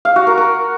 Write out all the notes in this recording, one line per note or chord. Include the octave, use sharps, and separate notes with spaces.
F5
F#4
A#4
A#4